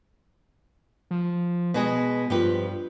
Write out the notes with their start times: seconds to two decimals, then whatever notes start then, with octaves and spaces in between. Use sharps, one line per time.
1.11 F3
1.74 B2 G#3 G#4 B4
2.30 G2 F3 G4 B4